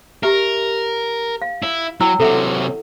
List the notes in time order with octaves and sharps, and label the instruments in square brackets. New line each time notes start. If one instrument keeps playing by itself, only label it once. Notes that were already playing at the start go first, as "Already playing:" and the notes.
[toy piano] G4 E5 [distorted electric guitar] A#4
[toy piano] F5
[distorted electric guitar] E4
[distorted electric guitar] F#3 [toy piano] E4 G5 E6
[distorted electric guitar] C3 F#3 [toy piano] A4 E5 F#5